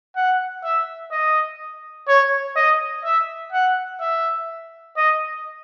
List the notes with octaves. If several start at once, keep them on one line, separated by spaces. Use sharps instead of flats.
F#5
E5
D#5
C#5
D#5
E5
F#5
E5
D#5